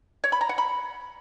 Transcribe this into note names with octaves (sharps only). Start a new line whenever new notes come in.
C#5
B5
A#5
F#5
B5